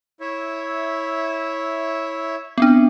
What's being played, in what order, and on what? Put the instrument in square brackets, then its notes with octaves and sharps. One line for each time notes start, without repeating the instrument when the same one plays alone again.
[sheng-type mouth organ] E4 C#5 E5
[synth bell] B3 C4 D4